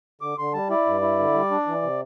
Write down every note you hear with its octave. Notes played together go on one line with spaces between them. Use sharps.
D3 D6
D3 C6
G3 A5
E4 D5
G2
E4
D3
G3
D4
E3
C3